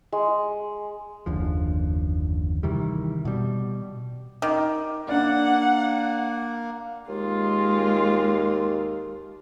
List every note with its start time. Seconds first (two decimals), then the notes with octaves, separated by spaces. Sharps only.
0.12 G#3
1.26 F#1 D#2 D3 F3
2.63 C3 D#3 E3 G3
3.25 B2 G3
4.42 D#3 D6
5.09 A#3 D4 D5 F#5
7.08 D#2 G#3 F4